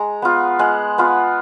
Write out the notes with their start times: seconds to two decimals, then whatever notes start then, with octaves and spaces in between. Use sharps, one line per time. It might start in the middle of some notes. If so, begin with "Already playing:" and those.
Already playing: G#3 A#5
0.22 B3 F4
0.59 G#3 F#5
0.98 B3 F4